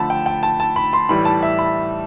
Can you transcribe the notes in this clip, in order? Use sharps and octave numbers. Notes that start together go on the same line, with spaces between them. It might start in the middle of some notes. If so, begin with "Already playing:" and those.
Already playing: D3 F3 A3 A5 B5
G5
G5
A5
A5
B5
C6
A2 E3 G3 B5
A5
E5
B5